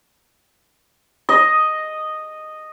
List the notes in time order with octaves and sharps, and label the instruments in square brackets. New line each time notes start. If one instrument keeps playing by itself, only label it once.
[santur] D#5